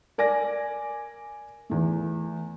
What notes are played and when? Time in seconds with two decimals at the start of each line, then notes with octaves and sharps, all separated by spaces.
0.18 A#4 D5 G#5 A#6
1.70 E2 A3